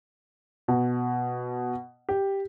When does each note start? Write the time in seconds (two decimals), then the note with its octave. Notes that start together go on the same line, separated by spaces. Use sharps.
0.68 B2
2.09 G4